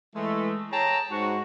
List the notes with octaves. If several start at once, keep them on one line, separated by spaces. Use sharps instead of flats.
E3 G#3 A3
G#4 C#5 G5 A5 A#5
G#2 F#4